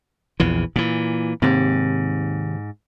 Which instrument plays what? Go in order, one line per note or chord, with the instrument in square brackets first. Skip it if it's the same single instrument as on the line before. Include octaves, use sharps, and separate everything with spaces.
[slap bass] A#1 E2 E3
A#2 E3
[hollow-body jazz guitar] D#2 C3 [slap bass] G#2